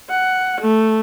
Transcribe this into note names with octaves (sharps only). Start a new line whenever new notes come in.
F#5
A3